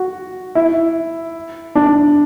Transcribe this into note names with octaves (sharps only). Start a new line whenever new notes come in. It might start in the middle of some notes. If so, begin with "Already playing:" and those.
Already playing: F#4
E4
D4